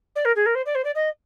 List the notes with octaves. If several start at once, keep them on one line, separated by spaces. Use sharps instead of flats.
D5
A#4
G#4
A#4
C5
D5
C5
D5
D#5